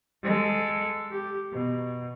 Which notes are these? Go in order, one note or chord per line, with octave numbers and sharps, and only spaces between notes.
G#3 A4
G4
B2